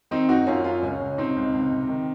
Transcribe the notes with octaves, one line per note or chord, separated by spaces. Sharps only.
D#3 C4 D#4
F#2 D#4 F#4
F#2 C#4 F4
F#2 C#4 F4
C#2 C#4
C#2
C3 C4 D#4
C#2
C#2
C3
D#3